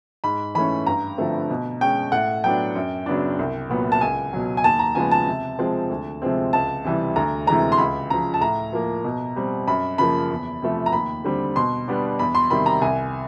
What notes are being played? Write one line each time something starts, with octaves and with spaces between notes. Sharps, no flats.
G#2 B5
E3 A3 C#4 B5
G2 A#5
D3 F3 A3 C4
B2
G#3 C#4 G5
A2 F#5
F#3 B3 D4 G5
F#2
C#3 F#3 B3 D4
C2
A#2 F#3 B3
A5
C#2 G#5
B2 F#3
G#5
D#2 A5
A#5
C#3 F3 G#3 B3 G#5
A5
C3
F3 G#3 C4
D2
C3 F3 G#3 C4
C#2 A5
C3 E3 G3
D2 A#5
C3 E3 G#3 A#5
C6
C#2 B5
C#3 F3 A#5
A5
A2 A#5
F3 A#3
B2
G3 C4
F#2 B5
C#3 F3 A#3 B5
E2
C3 F3 A3
A#5
D#2 B5
D3 G3 C4
B2 C6
G3 B3 D4
E2 B5
C6
C3 D#3 G3 B5
A#5
C2 G#5